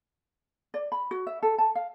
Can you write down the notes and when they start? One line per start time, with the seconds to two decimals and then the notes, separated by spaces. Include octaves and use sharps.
0.74 D5
0.92 B5
1.11 F#4
1.27 E5
1.43 A4
1.58 A5
1.75 F5